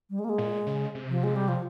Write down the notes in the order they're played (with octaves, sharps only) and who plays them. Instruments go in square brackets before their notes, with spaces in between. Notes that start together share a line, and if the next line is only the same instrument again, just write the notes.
[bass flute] G3
G#3
A#3
G#3
[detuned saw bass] A#2
C#3
C3
[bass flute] F3
G#3
G3
F3